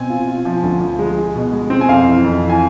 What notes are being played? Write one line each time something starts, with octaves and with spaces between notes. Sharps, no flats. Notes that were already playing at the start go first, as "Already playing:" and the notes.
Already playing: B2 C4 G#5
F4
F4
F3
D2
F3
G#3
G#3
B2
G#3
C4
G#5
F2 F5
E3
F2
E3
G#5